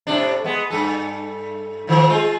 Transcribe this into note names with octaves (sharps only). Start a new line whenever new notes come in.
A2 C3 D4
G#3 B3
G2 A4
A2 D#3 F3
G#3 F4